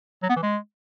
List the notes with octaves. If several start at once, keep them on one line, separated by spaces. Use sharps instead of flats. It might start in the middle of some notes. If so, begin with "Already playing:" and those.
F#3
B3
E3
G#3